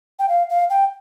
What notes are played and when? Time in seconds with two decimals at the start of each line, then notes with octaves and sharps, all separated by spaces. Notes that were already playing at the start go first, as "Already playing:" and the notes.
0.19 G5
0.29 F5
0.50 F5
0.70 G5